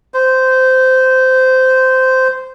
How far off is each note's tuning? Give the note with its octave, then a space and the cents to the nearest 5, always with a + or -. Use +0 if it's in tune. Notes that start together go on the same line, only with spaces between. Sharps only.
C5 -15